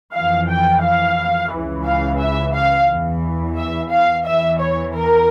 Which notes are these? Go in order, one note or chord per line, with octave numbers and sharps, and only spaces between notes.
F2 E3 F5
G5
F5
C#2 C#3 E3
F5
E5
F5
E2 E3
E5
F5
E2 E3 E5
C#5
A#4